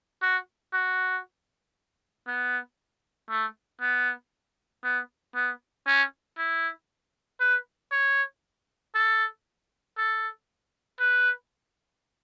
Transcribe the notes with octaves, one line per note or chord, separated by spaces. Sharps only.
F#4
F#4
B3
A3
B3
B3
B3
C#4
E4
B4
C#5
A4
A4
B4